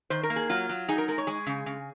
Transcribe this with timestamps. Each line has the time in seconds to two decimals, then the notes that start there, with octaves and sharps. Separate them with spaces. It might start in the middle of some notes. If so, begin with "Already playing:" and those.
0.10 D#3 C5
0.23 A#4
0.30 A#3
0.36 G#4
0.49 F#3 F4
0.69 F#3
0.88 D#4 G#4
0.98 A#4
1.08 G#3 A#4
1.18 C#5
1.27 G#3 G#4
1.47 C#3
1.66 C#3